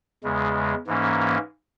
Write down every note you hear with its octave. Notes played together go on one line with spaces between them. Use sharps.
E2 C#3 G#3
G#2 E3 A#3 C#4